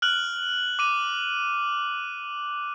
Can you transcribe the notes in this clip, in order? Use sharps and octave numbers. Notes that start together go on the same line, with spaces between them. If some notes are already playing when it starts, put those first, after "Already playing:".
F6 F#6 F#7
D6 D#7